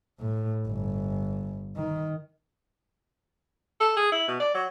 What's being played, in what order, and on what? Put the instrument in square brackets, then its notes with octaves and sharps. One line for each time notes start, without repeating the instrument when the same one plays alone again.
[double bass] A2
G1
D#3
[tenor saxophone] A4
G#4
E4
B2
D5
F#3